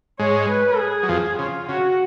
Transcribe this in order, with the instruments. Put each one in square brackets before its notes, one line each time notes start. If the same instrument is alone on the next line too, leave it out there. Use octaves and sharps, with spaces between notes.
[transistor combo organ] G#2 G#3 [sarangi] C#5
[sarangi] B4
G#4
[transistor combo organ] F#3
F2 F3
[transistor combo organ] C#3 [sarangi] F4
[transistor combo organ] C#3 [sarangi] F#4